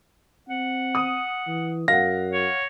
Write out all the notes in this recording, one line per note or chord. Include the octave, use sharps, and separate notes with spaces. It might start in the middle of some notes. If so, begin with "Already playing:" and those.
C4 F#5
D#6
E3
F#2 F5 F#5 A#6
C#5